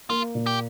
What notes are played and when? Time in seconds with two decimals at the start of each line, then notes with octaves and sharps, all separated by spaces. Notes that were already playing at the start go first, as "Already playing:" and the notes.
0.10 A#3 F4
0.35 A#2
0.47 G4